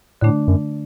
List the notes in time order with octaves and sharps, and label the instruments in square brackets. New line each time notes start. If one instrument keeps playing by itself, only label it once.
[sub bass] A2 [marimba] D3 A3 D4
[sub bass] F#2